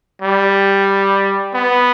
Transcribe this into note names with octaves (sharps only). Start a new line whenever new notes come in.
G3
B3